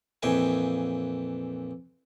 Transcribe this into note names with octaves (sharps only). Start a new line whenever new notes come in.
F2 A#2 E3 G5 G#5